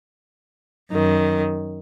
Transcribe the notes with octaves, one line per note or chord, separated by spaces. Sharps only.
F#2 D#3